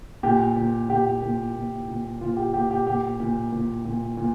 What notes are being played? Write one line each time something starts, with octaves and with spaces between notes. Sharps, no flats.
A#2 G4
A#2
A#2 G4
A#2
A#2
A#2
A#2 F4
G4
A#2 G4
G4
A#2 G4
A#2
A#2
A#2
A#2